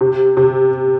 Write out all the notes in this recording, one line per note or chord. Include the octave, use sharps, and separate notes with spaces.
C3
C3